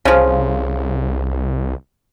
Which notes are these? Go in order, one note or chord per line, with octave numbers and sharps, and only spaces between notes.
C2 C#3 F3